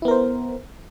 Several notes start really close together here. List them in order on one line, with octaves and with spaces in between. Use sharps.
E4 B3 A#4 C5